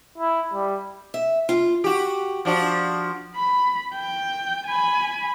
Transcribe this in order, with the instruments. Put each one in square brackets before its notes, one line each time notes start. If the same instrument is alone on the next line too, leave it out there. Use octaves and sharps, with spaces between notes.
[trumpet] E4
G3
[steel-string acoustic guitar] E5
F4
[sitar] F#4 G4
F3 D4 F#4
[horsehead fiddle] B5
G5
G#5 B5